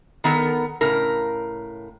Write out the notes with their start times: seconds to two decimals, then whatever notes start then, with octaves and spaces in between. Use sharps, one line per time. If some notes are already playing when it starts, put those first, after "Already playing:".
0.24 D#3 B3 A4 A#4
0.81 A2 C#3 A#4